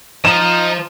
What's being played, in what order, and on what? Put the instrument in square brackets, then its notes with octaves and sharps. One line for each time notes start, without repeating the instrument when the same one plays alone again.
[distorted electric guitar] F3 [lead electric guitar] D#5 A#5 [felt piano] E7